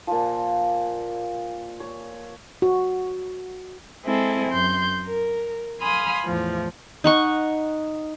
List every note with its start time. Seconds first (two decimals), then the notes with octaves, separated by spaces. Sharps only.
0.07 A#2 F3
1.80 C#5
2.62 F#4
4.05 G#3 C4 E4 G#4 A4
4.49 F#2 C6 G6
5.06 A#4
5.81 F5 G#5 B5 C6 D#6 F6
6.25 E2 A2 F3
7.04 D#4 F#5 C#6